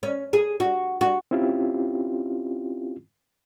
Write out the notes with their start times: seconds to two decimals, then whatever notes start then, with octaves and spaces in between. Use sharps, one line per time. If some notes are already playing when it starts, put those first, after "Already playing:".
0.03 C#4
0.33 G#4
0.60 F#4
1.01 F#4
1.31 C4 C#4 E4 F4 G4